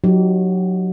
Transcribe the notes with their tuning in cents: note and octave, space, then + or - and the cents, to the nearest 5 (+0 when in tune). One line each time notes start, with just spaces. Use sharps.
F#3 -15 D#4 +0 G4 -30